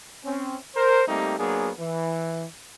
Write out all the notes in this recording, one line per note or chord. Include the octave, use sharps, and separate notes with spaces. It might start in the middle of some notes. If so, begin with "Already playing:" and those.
C4 C#4
A#4 C5
G3 A3 A#3 C4 D#4 G4
F#3 A#3 B3 D4 G#4
E3